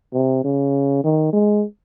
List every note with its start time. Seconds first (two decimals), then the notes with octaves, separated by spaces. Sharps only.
0.13 C3
0.44 C#3
1.04 D#3
1.33 G#3